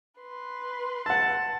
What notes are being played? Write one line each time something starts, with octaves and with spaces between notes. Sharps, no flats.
B4 C6
F#5 A5 E6